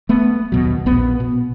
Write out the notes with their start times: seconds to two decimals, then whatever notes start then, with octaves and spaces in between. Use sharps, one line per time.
0.09 A3 B3
0.52 D#2 B2 F#3
0.86 A#1 B3
1.20 B2